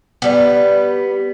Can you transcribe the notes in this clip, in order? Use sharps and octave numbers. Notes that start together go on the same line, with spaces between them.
G3 B3